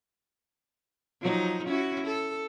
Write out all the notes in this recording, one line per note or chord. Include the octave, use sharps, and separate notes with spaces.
F3 F#3 D#4
C#4 E4 F#4
A4